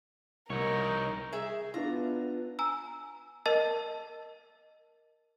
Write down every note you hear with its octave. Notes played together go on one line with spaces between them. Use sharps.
C2 D#4 A#4 C#5
G#4 E5
B3 D4 F4 A#5
G#5 A#5 E6
A#4 D#5 A5